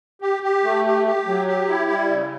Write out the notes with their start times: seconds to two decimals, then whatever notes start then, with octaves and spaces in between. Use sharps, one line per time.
0.22 G4
0.43 G4
0.64 A3
0.85 G4
1.06 G4
1.27 F#3
1.48 G4
1.69 E4
1.90 G3
2.10 C#3